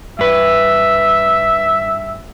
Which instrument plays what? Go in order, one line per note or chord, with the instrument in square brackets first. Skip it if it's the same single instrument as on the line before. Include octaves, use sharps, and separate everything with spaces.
[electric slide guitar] G2 B4 [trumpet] E5